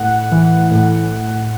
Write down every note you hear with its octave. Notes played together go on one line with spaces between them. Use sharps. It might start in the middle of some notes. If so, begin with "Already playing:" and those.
Already playing: A2 F#5
E3
A2